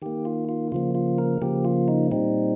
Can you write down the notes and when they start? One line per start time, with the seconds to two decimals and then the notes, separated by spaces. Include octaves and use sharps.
0.02 D#3 A#3 G4
0.25 F4
0.49 F4
0.72 C#3 F3 A#3 F4
0.95 F4
1.18 A#4
1.42 C#3 F3 A#3 G4
1.65 F4
1.88 D#4
2.11 A#2 G3 C4 D#4